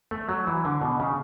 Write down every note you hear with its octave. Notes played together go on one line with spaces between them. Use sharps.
A3
F#3
E3
D3
B2
C#3